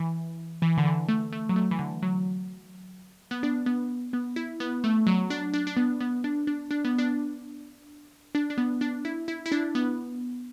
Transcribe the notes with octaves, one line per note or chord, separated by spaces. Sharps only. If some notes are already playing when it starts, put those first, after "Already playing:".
Already playing: E3
E3
D3
E3
A3
A3
F#3
A3
E3
D3
F#3
B3
D4
B3
B3
E4
B3
A3
F#3
D4
D4
D4
B3
B3
D4
D4
D4
B3
D4
D4
D4
B3
D4
E4
E4
E4
D4
B3